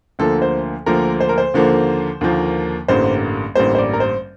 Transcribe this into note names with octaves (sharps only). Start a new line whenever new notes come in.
D2 D3 F3 A#3 A4
C5
D2 D3 F3 A#3 A#4
C5
A#4
C5
D#2 D3 F3 A#3
D#2 D3 F3 A#3
A1 G2 D3 G3 A#3 C5
A1 G2 D3 G3 A#3 C5
C5
D5
A#4
C5